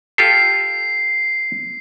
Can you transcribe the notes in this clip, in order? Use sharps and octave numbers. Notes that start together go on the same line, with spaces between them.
F4 G4 A4 C7